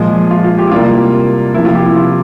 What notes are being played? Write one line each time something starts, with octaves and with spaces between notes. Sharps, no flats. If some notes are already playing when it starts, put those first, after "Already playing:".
Already playing: A#2 F3 G#3
F4
F4
G4
E4
C3 G3 A#3 F4
C3 F3 A#3 E4
F4
G4
E4
F4